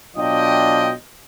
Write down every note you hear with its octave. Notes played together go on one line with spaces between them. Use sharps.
B2 F#3 D4 F4 D#5 G5